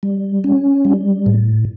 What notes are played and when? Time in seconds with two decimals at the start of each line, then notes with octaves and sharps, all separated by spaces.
0.03 G3
0.44 C#4
0.85 G3
1.26 A2